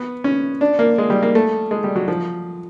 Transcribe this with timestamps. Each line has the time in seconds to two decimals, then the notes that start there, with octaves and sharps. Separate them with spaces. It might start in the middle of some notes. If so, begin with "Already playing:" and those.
Already playing: B3
0.24 C#4
0.61 D4
0.79 A#3
0.98 G#3
1.10 G3
1.23 A#3
1.35 A3
1.71 G#3
1.84 G3
1.96 F#3
2.08 F3